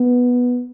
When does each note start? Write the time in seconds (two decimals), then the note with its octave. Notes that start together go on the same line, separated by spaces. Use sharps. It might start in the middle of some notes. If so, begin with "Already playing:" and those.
Already playing: B3